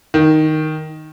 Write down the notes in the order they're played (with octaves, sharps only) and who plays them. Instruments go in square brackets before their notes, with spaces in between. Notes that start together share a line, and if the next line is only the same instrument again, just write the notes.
[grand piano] D#3